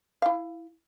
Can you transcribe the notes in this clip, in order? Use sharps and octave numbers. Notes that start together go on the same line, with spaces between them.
E4 F5